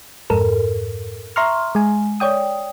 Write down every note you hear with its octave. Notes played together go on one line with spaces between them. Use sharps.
F2 G#2 A4 A#4
E5 A#5 C6 C#6 F6
G#3 G#5
C#5 D5 G5 D#6